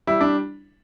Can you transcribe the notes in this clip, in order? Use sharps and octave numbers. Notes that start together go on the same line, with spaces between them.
G3 E4
D4